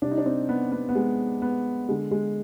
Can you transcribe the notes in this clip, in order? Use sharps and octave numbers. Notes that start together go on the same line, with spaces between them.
C3 G3 D4
D#4
D4
C4
B3
B3
B3
G#3
B3
D3 G#3
G#3